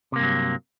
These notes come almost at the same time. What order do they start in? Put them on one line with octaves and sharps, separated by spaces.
C3 A#3 G2 F#3